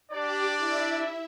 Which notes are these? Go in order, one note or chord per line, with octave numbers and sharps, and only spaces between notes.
D4 G4 D5
E4 E5